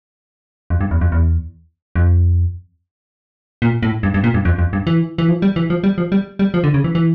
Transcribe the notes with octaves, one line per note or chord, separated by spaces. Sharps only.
F2
G2
E2
F2
E2
F2
A#2
A2
G2
G2
A#2
G2
F2
F2
G2
E3
E3
F3
G3
E3
F3
G3
F3
G3
G3
F3
D3
C#3
E3
E3